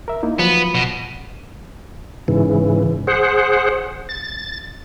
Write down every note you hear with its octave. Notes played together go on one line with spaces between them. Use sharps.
A#4 E5
A#3 D#4 E4
F3 F#3 B3
B2
G#2 C#3 E3
G#4 C5 F#5
A6